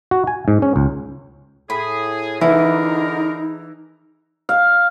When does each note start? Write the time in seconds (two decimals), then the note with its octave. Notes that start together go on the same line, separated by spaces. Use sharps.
0.11 F#4
0.27 G#5
0.48 G#2
0.62 C#4
0.76 C#2
1.70 A2 G#4 B5
2.41 D3 E3 D#4 E4 G#4 A#4
4.49 F5